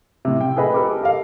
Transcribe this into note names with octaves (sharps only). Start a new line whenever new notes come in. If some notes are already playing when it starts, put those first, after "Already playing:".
A2 C3
G5
G#4 A4 B4 D#5 B5
G4 A4 A#4 D6
G4 D#5 F5